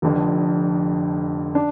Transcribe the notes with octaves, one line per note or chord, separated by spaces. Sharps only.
F1 F2 D3
D4